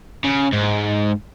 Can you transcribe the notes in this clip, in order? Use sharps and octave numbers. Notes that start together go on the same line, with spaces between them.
C#3
G#2